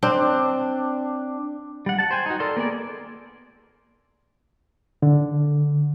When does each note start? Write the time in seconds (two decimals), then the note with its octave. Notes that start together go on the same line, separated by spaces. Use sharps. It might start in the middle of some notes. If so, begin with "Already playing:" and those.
0.03 C4 D4
1.86 G3 F#5
1.99 F#5 A5
2.11 C5 G5 G#5
2.26 D#4 F#4
2.40 A4 A#4 D5 C6
2.57 A#3 B3 G#4 D5
5.02 D3